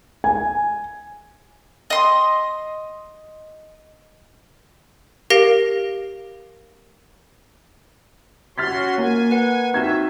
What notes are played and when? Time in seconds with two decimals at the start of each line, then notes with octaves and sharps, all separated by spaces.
0.24 G#5
1.90 D#5 C6 D#6
5.30 G4 A#4 F5 A#6 D7
8.58 C#4 F#4 C6 F6 A6 B6
8.98 A#3 G#5
9.31 B4 F#5
9.74 C4 D#4 F#4 E5 G#6